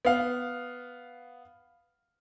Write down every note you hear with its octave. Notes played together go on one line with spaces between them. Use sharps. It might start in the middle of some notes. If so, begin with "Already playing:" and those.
B3 F5